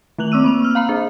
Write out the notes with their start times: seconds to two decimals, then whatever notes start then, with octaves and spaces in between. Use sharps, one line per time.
0.18 D#3 A3 F#6 F7 F#7
0.32 C4 D6 E6 D#7
0.44 A#3 C#6 F7
0.62 E6 F6
0.75 F5 A#5 B5
0.89 D4 G#4 C5